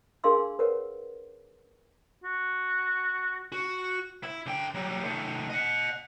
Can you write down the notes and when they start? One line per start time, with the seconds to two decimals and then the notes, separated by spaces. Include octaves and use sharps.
0.24 D4 G#4 A#4 F5 C6 E6
0.59 A#4 B4 C#5 F#5
2.24 F#4
3.52 F#4
4.23 E4
4.46 D3 G5
4.75 F#3 G3
5.04 D#3 A3
5.49 D#5 F#5